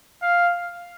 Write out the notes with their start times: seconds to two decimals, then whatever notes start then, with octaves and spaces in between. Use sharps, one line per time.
0.22 F5